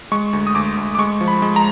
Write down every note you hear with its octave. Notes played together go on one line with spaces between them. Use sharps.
G#3 C#6
D2
D#6
D2 D6
D2
D6
G#3 C#6
F3
B5
G#3
A#5